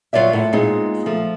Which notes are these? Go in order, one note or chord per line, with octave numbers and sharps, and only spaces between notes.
A#2 F#3 F4 C#5 D5 E5
A2 E4
A#2 G#3 B3 C4 D#4
F3 A3